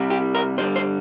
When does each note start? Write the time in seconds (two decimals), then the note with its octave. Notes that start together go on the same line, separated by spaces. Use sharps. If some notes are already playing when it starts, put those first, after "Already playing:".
Already playing: C2 C3 G3
0.10 G4
0.35 A#4
0.58 G2 D3 G3 C5
0.76 C5